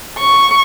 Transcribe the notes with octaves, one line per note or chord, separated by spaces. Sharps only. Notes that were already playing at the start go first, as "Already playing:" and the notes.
C#6